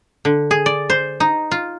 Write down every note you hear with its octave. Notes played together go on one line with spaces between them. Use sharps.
D3
G#4
D5
C5
D#4
F4